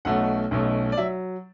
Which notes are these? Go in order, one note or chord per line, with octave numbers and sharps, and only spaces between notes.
B1 B2 A3 C#4 F#5
B1 B2 A3 C#4
D5
F#3 E5